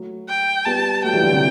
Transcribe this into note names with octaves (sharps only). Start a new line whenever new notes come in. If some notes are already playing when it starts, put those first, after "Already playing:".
Already playing: F#3 A3
G5
G3 B3 A5
F#3 A3 G5
E3 G3
D3 F#3
C3 E3